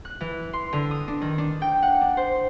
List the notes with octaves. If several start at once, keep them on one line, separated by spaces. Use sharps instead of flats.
F#6
E3
C6
D3
D#6
D4
D#3
D4
G5
F#5
D4
C5